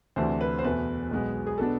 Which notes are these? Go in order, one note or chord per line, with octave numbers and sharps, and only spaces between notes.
D2 C3 E3 A3 D4 C5
B4
C5
E2 B2 A3 B4
B1 B2 G#3 B3
G#4
B2 B3 D4 A4